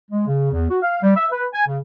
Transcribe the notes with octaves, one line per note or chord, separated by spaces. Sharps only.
G#3
C#3
E2
F#4
F5
G3
E5
B4
G#5
C#3